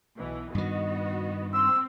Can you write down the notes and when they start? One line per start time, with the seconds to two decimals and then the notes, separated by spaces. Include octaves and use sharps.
0.17 B1 B2 E3
0.55 G2 D#3 B3 F#4 D#5
1.54 C4 C6 E6